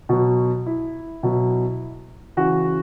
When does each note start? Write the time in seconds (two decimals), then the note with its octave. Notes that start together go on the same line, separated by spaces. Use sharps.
0.09 B2 F#3 F#4
0.66 E4
1.23 B2 F#3
2.37 C#3 E3 F#4